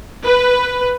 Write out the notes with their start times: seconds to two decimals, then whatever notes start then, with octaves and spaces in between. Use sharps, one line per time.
0.24 B4